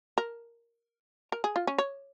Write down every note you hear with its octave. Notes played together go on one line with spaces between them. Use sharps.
A#4
A#4
G#4
F4
C#4
C#5